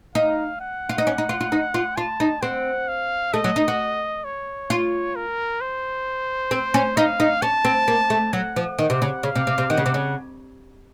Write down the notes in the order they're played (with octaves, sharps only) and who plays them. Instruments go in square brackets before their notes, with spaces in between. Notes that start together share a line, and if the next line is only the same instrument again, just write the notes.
[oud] D#4 [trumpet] F5
[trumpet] F#5
[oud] F4
D#4
C#4
D#4
F4
F4
D#4
F4
[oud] F4 [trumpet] A5
[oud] D#4
[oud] C4 [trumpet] F#5
[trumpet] F5
[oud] A3 [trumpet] D#5
[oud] F#3
D#4
F#4
[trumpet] C#5
[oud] F4
[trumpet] A#4
C5
[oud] C4
C#4
[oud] D#4 [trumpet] F5
[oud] D#4
[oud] C#4 [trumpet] A5
[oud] C4
A#3
A3
[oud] F#3 [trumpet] F#5
[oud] F3
D#3
C3
C#3
[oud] C#3 [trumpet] F5
[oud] C3
C3
C3
[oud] D#3 [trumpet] F#5
[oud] C#3
C3
C#3